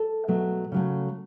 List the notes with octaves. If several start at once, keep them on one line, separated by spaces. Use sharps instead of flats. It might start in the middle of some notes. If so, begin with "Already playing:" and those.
Already playing: A4
B2 F#3 A3
C#3 F#3 A3